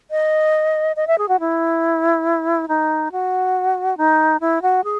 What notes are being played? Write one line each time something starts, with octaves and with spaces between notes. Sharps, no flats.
D#5
D#5
E5
G#4
F#4
E4
D#4
F#4
D#4
E4
F#4
G#4